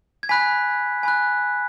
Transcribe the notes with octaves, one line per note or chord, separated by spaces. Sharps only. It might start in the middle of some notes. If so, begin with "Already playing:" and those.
G#6
G#5 B5 F#6 B6
G#5 B5 F#6